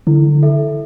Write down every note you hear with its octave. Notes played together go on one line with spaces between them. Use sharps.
D3 E4
A4 E5